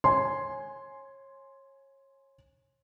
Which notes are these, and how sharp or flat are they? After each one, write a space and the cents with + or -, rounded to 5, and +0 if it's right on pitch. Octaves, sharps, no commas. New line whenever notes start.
C#5 -30 G#5 +10 C6 +0